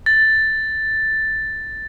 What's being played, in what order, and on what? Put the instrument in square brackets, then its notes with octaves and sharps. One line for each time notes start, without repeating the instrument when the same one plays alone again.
[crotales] A6